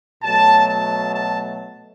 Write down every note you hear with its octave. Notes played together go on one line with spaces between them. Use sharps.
B2 F#3 A3 A5
A5
A5